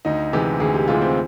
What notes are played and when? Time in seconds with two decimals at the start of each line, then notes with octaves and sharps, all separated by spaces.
0.05 D2 D#4
0.33 C3 E3 G#3 G4
0.60 D2 G#4
0.74 G4
0.88 C3 E3 G#3 F4
1.02 C4